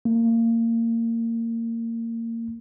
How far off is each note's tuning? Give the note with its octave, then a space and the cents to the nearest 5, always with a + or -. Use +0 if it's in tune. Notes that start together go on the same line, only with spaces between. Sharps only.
A#3 -25